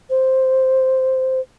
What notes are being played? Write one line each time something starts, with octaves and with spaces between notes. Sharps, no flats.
C5